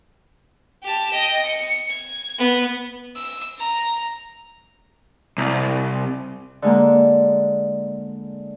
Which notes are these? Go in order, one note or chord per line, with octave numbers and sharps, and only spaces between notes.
G4 A5
D#5 G5
C#7
G#6
B3
E6
A#5
C2
D3 G#3 A#3